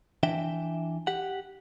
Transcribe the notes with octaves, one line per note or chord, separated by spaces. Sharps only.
E3 D4 E5 G5
G4 F#5